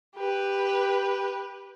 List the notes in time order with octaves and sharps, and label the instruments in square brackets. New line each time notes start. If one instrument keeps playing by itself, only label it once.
[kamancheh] G4 B4